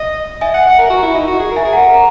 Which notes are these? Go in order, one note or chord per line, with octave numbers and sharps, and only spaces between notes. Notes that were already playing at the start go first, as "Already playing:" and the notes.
Already playing: D#5
D#5 E5 G#5
F#5
F#5
A#4
F#4
E4
D#4
F#4
G#4
A#4 E5 G#5
G#4
A#4 F#5 A#5
A#4